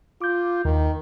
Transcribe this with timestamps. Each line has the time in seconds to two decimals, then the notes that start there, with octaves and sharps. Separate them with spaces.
0.22 F4 D6 G6
0.65 D#2 D#3